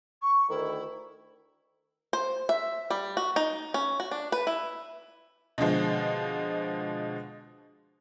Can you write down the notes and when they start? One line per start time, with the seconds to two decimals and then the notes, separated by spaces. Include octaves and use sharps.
0.21 C#6
0.49 D2 D#3 E4
2.13 C5
2.49 E5
2.90 G3
3.17 F#4
3.36 D#4
3.74 C#4
4.00 F#4
4.11 D4
4.32 B4
4.47 E4
5.58 B2 D3 F3 G#3